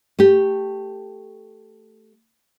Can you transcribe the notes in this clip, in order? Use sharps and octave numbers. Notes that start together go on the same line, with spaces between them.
A3 G4